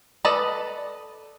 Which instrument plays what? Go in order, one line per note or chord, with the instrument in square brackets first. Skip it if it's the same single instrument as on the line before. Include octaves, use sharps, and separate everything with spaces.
[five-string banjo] A4 B4 D5 D#5